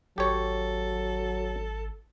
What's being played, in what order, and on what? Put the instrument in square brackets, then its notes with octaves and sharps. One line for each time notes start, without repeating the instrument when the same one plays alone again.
[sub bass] G#1 [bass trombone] F#3 [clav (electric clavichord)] G4 C#5 [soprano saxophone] A4